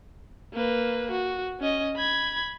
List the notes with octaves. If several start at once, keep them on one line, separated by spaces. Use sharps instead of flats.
A#3 B4
F#4
C#4 D#5
B5 G#6